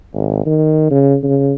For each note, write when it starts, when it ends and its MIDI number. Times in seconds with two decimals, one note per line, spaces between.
0.15 0.45 32
0.46 0.87 51
0.91 1.17 49
1.23 1.53 49